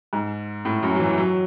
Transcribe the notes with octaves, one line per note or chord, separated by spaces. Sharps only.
G#2
A2
F#2
F#3
E3
F#3